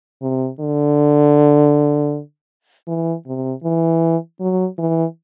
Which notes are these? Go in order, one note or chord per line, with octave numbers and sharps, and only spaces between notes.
C3
D3
E3
C3
E3
F#3
E3